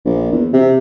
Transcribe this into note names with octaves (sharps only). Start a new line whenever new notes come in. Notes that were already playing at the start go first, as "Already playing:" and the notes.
A#1
E2
C3